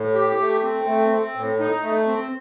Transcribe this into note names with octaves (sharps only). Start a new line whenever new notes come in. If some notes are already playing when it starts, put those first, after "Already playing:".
Already playing: A2
G4
A3
C4
A3
C4
A2
D#4
A3
C4